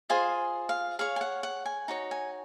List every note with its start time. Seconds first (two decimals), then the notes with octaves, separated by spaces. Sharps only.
0.09 F4 G#4 C5 D#5 G#5
0.69 F5
0.99 G#4 C#5 F5
1.16 G#5
1.21 F#5
1.43 F#5
1.65 G#5
1.88 D#4 F#4 C#5
2.11 G#5